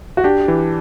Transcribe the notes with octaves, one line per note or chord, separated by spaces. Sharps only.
F#4
D4 G4
E3